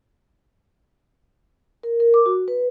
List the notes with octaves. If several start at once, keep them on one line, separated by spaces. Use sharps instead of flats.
A#4
A#4
D6
F#4
B4